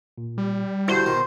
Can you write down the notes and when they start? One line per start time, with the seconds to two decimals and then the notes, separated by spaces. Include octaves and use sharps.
0.18 A#2
0.38 G3
0.88 G2 D3 E4 F#4 C5
1.06 B2 D#3